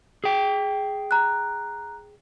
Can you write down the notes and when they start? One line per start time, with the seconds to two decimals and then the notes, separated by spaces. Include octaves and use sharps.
0.24 G#4 G5
1.11 A#5 F#6